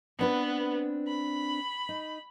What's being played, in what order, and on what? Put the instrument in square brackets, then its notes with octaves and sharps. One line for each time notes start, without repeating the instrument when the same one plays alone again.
[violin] B3 [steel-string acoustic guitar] C4 D4 B4
[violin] B5
[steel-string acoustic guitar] D#4